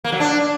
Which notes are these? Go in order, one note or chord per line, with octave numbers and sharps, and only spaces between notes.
A#3
F#3
D4